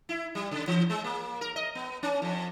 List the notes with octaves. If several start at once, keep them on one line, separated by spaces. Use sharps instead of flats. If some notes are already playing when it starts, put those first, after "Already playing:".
E4
G3
C#3
E3
G#3
A#3
A#4
D#5
B3
C#4
F2